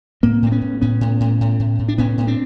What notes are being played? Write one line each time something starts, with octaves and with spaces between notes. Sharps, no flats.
A2 A#3 C4
A2 C4
B3 C#4
A2
A2 B3 C#4
A2
A2
A2
A2
A2
D4
A2 B3 C#4
A2
C4 D4